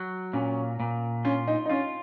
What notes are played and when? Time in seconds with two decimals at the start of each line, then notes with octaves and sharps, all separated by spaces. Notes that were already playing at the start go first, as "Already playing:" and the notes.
Already playing: F#3
0.33 A#2 C#4
0.80 A#2
1.25 C#4 F4
1.47 D#4
1.66 D#4
1.70 C#4 F4